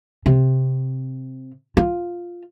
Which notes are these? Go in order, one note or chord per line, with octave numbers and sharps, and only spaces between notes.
C3
F4